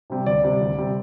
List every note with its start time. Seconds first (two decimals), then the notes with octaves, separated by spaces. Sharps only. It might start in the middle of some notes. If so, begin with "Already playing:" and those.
0.10 C3 G3 C4
0.26 D2 D5
0.43 C3 G3 C4
0.61 D2
0.77 C3 G3 C4